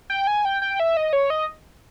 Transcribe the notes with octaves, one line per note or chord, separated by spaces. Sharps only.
G5
G#5
G5
G5
E5
D#5
C#5
D#5